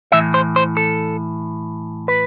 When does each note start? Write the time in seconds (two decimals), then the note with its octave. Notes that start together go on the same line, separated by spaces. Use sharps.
0.12 A2 E3 E5
0.34 C5
0.56 C5
0.77 A4
2.08 B4